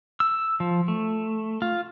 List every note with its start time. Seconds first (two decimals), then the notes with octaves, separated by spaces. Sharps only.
0.20 E6
0.60 F3
0.88 A3
1.62 F4